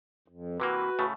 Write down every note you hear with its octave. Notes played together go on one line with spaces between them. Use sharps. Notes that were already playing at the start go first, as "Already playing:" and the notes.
F2
C3 E3 A#3 F#4 B4
A2 C#3 A3